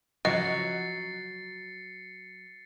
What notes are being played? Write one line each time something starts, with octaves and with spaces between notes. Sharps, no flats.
C#3 F3 F#3 D#5 A6 C7 C#7